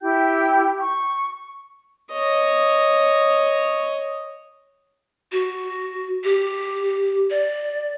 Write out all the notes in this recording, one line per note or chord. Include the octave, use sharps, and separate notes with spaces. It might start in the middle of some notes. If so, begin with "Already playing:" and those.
E4 G4 G5 G6
C#6
C#5 D#5
F#4
G4
D5